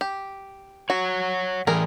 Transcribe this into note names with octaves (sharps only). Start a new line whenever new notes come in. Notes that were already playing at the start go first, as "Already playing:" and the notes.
G4
F#4 C#5 F#5
A2 E3 G3 A3 G#4 A#4